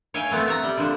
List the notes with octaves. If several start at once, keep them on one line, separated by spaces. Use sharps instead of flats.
C#5 E5 F5 G5 G#5
A3 B3 C4
E5 A#5
G3
D3 F3